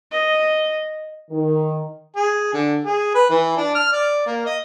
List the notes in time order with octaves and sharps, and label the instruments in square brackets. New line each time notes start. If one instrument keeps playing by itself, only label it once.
[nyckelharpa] D#5
[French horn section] D#3
[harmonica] G#4
D3
G#4
B4
E3
D4
F6
D5
A#3
D#5